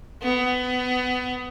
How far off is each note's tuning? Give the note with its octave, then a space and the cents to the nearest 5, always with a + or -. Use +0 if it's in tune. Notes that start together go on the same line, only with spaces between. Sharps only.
B3 +25